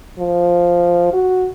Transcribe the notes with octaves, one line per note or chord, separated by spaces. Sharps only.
F3
F#4